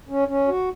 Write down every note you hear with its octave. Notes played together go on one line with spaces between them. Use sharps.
C#4
C#4
F#4